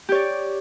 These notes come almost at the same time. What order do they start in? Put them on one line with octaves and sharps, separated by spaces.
G4 C#5 D5